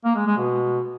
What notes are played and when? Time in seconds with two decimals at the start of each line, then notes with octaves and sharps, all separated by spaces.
0.05 A#3
0.15 G#3
0.26 G#3
0.37 B2